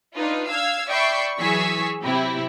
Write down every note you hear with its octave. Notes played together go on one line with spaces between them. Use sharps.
D4 D#4 F4 B4
F5 E6 G#6
D5 E5 G5 B5 C#6 C7
E3 F#3 G#4 C#6 E6 B6
C3 F#3 C4 E4 G4